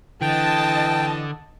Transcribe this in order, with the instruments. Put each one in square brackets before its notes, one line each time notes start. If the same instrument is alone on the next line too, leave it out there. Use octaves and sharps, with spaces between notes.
[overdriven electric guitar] D3 [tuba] E3 [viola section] D#5 A5 [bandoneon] G5